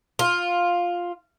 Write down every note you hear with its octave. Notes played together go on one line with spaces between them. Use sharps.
F4